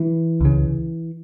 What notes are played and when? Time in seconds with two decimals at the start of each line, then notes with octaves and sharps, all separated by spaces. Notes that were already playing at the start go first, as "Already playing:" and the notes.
Already playing: E3
0.41 C#2 C#3